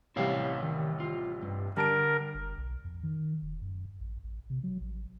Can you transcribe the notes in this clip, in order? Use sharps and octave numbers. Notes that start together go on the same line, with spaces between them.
A1 C3 G3 E4 C#5 F5
D#3
F4
G2
D3 G3 A#4 A5 D7
F#1
B1
F2
D#3
E1
F#2
A1
A1
C3
F#3
A1